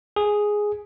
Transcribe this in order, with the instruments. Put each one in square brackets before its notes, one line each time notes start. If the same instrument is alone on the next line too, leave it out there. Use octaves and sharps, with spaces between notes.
[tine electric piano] G#4